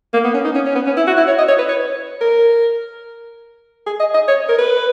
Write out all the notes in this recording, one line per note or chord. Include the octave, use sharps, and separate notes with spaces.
A#3
B3
C#4
D#4
C#4
C#4
B3
C#4
E4
F#4
E4
C#5
D#5
C#5
B4
C#5
A#4
G#4
D#5
D#5
C#5
A#4
B4